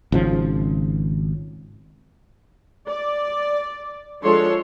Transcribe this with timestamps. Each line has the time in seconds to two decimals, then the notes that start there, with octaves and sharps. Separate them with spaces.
0.12 G#1 C#3 F3
2.87 D5
4.23 F3 G#3 D4 A4 C#5 C6